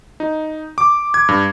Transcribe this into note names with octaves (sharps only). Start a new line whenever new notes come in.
D#4
D6
G#6
G2